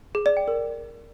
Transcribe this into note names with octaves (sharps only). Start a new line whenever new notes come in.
G#4
D5
G5
A#4